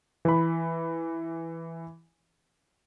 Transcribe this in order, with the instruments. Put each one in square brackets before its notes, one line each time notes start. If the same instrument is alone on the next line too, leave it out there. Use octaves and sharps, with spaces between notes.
[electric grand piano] E3 B5